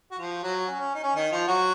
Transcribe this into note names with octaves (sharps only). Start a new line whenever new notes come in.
F#4
F3 F4
F#3 F#4
C#4
C#4
D#4
C#4
D#3 D#4
F3 F4
F#3 F#4